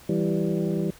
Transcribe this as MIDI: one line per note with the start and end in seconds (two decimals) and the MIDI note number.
0.09 0.90 52
0.09 0.90 55